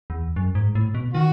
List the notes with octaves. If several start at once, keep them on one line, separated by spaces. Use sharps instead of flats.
E2
F#2
G#2
A2
B2
D#3 F#4